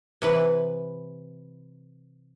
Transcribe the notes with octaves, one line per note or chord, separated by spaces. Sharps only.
C3 E3 B4